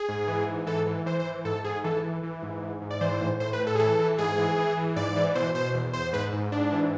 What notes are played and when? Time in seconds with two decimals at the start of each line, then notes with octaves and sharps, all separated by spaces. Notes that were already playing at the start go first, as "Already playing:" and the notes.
Already playing: G#4
0.09 G#2
0.28 E3
0.48 G#2
0.67 E3 A4
0.87 E3
1.06 E3 C5
1.19 C5
1.25 E3
1.45 G#2 A4
1.64 G#2 G#4
1.84 E3 A4
2.04 E3
2.23 E3
2.42 G#2
2.62 G#2
2.82 G#2
2.91 D5
3.01 E3 C5
3.21 A2
3.40 A2 C5
3.53 B4
3.60 A2
3.67 A4
3.75 G#4
3.79 E3 A4
3.99 E3
4.18 G#2 G#4
4.38 E3
4.58 E3
4.77 E3
4.96 G#2 D5
5.16 E3
5.35 B2 C5
5.55 B2 C5
5.74 E2
5.93 E2 C5
6.13 G#2 B4
6.33 G#2
6.52 G#2 D4
6.72 E3